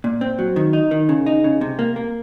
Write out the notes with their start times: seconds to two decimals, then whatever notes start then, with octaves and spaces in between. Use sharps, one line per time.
0.04 A#2
0.21 C4
0.39 F#3
0.56 D#3
0.73 D#4
0.91 D#3
1.09 C#3
1.26 D#4
1.44 C#3
1.61 C3
1.79 A#3
1.96 A#3